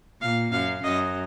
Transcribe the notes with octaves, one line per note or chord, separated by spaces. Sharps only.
A#2 F5
F#2 F5
F#2 D#5